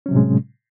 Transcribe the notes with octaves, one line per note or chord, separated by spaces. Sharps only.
A2 C3 F#3 G#3 C#4